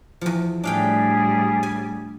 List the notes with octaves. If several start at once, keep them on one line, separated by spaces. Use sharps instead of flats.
E2 F3
A2 G3 D4 G#4 F5 G5
G#5